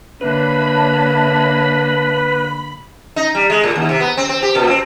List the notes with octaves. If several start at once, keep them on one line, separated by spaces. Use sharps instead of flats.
D3 A#3 B4 C#5 E5 A5 B5
D#4
G3
G#3
A2
D#2
C3
B3
C4
C4
G4
A#2
C4